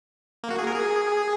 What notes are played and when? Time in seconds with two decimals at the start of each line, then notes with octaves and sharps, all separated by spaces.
0.44 A#3
0.51 F#4
0.59 G#4
0.67 A#4
0.75 G#4